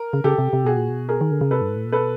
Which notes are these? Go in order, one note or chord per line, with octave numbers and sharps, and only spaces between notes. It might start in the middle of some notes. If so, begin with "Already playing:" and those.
Already playing: A#4
C#3
C#3 G4 A4
C3
C3
B2 F#4 G#4
A#2
B2
G#4 A#4
D#3
D3
C#3
C3 A4 B4
G2
G#2
A2
A#2
B2 A4 B4